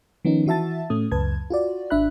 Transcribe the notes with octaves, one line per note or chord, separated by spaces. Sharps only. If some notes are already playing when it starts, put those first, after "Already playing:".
D#3 F3 B3 C#4 D#4
E3 F#4 E5 A5 A6
A2 A3 C#4 D#6
C#2 F#2 B4 A5 G#6
F4 F#4 D5
G#1 D4 E5 B5 F#6